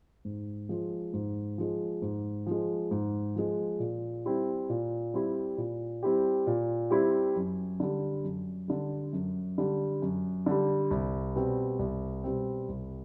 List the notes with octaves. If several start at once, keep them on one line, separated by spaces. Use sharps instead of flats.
G#2
F3 G#3
G#2
F3 G#3
G#2
F3 G#3
G#2
F3 G#3
A#2
G3 C4 E4 G4
A#2
G3 C4 E4 G4
A#2
G3 C4 E4 G4
A#2
G3 C4 E4 G4
F#2
D3 G3
F#2
D3 G3
F#2
D3 G3
F#2
D3 G3
C2
B2 G3 C4
C2
B2 G3 C4
C2